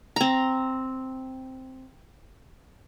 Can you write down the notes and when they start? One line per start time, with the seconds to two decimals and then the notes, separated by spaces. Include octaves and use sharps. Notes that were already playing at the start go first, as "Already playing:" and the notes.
0.16 C4 A#5